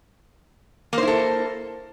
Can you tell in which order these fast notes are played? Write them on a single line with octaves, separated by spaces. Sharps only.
A#3 C5 E4 A4